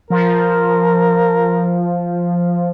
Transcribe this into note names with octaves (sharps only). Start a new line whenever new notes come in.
F3 A#4